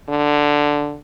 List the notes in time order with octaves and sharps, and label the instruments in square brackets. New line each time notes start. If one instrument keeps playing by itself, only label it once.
[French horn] D3